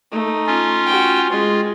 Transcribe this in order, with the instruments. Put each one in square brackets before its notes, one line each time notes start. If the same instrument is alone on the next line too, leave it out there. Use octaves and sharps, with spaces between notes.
[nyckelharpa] A3 D#4
[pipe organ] C#4 F4
[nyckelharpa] F#4 G5
[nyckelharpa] G#3 [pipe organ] F4